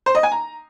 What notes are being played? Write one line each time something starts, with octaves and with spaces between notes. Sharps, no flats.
C5
D#5
G#5
A#5